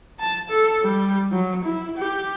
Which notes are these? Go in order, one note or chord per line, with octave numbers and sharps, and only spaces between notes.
A5
A4
G3
F#3
E4
G4